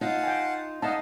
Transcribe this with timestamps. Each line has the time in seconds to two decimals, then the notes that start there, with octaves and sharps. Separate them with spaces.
0.01 D#4 F4 F5 F#5 A5
0.23 G5 G#5
0.82 D#4 D#5 F5 F#5 A5